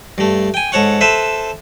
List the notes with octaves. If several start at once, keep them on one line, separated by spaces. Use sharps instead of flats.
G2 A3
G5 G#5
G#2 A4 C#5 F#5 C#6
A4 B4 C5 E5